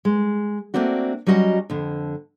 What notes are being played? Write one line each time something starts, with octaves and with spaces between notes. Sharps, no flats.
G#3
A3 A#3 C4 D4 F#4
F#3 G3 C#4 F#4 D#5 A#5
F2 D3